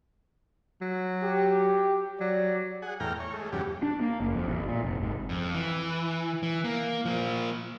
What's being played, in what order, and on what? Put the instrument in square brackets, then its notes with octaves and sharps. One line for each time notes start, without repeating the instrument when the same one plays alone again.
[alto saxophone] F#3
[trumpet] G4
[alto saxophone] F#3 [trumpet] D5
[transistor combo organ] G#4 F#5
E2 A2 G5 A#5 F6
C#5
G#3 A3
E2 G2 C#3 F#3 G4
[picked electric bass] D4
A#3
F#1
F2
A1
A#2
F1
G#1
[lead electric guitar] F2
E3
E3
A#3
F3 A#3